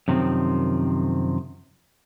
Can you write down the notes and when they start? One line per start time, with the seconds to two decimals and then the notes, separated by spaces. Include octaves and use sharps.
0.08 F#2 C3 D#3 F3 C4